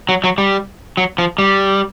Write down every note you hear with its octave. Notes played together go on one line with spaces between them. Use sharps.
F#3
F#3
G3
F#3
F3
G3